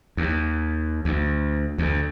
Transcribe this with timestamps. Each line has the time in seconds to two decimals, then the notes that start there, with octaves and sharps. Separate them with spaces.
0.17 D#2
1.05 D2
1.78 D2